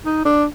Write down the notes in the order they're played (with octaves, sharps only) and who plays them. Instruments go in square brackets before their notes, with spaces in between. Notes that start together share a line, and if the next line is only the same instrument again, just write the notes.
[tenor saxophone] D#4
D4